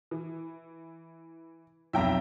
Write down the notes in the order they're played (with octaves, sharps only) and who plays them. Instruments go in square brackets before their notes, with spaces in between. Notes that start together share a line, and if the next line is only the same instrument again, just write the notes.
[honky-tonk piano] E3
[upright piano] B1 F2 [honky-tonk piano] E5 G5 A#5